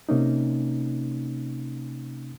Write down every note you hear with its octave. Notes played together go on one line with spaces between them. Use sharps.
C3 A#3 C#4 D#4